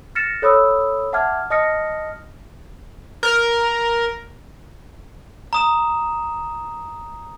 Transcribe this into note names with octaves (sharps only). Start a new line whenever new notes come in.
F6 A6 A#6 C#7 E7
A4 C#5 B5 D#6 E6
E5 F#5 A5 D6 F6 G#6
D#5 A5 D#6 F6 A#6 C#7
A#4
A#5 D#6 E7